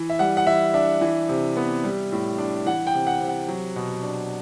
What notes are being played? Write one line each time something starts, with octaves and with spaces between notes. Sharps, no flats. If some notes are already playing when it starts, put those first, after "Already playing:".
Already playing: E3
E5
G3 F#5
F#5
E3 E5
D4 E5
E3
C3
B3
G3
A2
D4
E3 F#5
G5
C3
F#5
C3
F#5
F#3
B2
D4